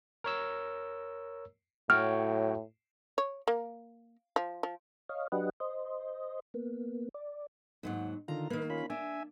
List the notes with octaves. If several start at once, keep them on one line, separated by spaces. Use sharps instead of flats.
A#4 C#5 E6
A2 F#4 C#5 G5 F6
C#5
A#3
F3
F3
C#5 D#5 F5
F#3 D4 G4 B4 D#5 F#5
C5 D#5
A#3 B3
D5
D#2 G#2 F#3
D3 D#3 F4 A#5
D#3 A#3 B4
C#4 F4 B5
D4 E5 G#5